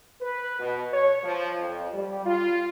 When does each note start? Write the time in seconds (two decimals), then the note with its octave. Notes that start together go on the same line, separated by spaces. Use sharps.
0.21 B4
0.60 B2
0.93 C#5
1.23 F3
1.58 F2
1.92 G3
2.26 F4